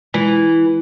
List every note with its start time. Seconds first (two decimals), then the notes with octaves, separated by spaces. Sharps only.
0.14 E3 G#3